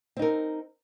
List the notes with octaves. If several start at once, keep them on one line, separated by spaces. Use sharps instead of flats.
C4 D#4 A#4